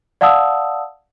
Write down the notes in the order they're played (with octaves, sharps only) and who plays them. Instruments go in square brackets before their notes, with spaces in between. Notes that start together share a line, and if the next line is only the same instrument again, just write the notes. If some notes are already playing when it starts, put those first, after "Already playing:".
[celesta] D5 F5 F#5 A5 D#6 E6